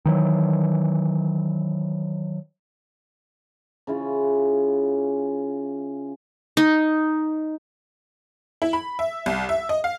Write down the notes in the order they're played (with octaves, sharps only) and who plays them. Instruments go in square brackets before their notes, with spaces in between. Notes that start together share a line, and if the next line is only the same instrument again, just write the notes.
[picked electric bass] D#3 E3 F#3
[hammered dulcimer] C#3 C#4 E4 F4
[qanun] D#4
[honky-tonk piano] E4
B5
E5
C2
E5
D#5
F5